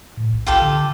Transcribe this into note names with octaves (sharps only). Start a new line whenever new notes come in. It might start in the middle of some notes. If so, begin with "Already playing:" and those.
A2
A#1
C#2 F4 G4 A4
D3